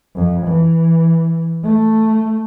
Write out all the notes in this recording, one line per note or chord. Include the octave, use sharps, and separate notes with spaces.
F2
E3
A3